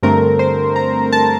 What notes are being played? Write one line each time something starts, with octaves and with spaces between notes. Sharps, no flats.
G2 D3 A3 C4 A#4
C5
A#5
A5